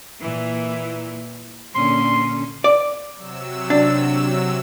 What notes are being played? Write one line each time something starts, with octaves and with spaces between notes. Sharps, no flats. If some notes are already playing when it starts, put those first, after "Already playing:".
A#2 E3
A#2 D3 C#4 C6
D5
C3 F#3 E6
D4